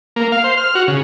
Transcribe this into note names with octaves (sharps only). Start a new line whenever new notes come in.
A#3
F5
C5
F6
F#4
C#3